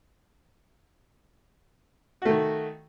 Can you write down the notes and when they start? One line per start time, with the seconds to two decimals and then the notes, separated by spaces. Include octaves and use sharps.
2.22 F#4
2.25 A3
2.29 D#3